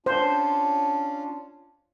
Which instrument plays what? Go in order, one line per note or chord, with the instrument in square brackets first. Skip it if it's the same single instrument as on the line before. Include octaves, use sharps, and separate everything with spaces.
[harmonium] C#4 D4 F4 [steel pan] C5